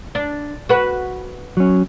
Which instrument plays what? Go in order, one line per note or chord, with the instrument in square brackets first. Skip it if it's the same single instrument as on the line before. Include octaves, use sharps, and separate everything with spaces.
[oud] D4
F#4 B4
[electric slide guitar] F#3 C#4